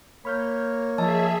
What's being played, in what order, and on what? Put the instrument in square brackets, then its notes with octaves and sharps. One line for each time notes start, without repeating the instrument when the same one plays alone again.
[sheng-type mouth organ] A#3 C#5 [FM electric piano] B5 F6 G6
[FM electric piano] F3 D#5 E6 [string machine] G#4 E5 [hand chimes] A5